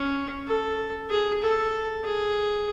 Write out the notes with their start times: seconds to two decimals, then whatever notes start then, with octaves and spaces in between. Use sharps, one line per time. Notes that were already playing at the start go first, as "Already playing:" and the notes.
Already playing: C#4
0.47 A4
1.10 G#4
1.42 A4
2.04 G#4